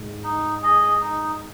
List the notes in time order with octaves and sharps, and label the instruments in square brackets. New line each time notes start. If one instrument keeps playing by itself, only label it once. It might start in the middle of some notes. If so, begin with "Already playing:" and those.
Already playing: [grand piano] G#2
[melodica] D#4
G#4 D#5
D#4